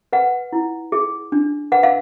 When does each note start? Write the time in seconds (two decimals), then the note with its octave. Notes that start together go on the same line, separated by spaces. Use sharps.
0.13 B4 F#5
0.53 E4
0.92 G#4
1.32 D4
1.72 B4 F#5
1.83 F5